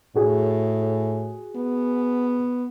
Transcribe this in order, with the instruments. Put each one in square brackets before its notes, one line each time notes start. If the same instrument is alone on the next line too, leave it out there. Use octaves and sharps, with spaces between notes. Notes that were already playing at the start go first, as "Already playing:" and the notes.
[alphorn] A2 [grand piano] F#4 G#4
[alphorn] B3